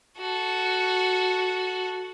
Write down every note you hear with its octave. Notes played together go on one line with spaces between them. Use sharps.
F#4 A4